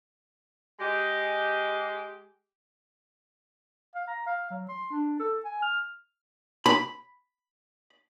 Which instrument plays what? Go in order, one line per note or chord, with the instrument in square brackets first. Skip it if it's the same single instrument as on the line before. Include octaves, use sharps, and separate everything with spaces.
[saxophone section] G#3 G4
[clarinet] F5
A#5
F5
F#3
C6
D4
A4
G#5
F6
[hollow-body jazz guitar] B5